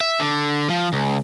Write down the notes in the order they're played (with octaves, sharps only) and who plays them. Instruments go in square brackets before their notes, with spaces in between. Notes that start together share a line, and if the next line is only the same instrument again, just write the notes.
[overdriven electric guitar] E5
D3
F3
C#2